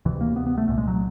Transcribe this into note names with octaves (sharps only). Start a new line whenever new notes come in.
D2 C3 E3
A#3
B3
B3
A3
C2 A#2 A3
G#3
F#3